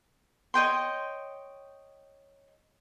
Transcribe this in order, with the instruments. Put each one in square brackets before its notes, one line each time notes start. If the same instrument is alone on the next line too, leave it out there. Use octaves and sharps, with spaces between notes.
[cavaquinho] C#5 D#5 G5 C6